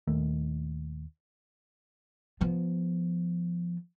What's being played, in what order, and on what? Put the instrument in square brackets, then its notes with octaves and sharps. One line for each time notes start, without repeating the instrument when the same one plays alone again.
[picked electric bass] D#1 D#2 D#3 A3
[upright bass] F3 B3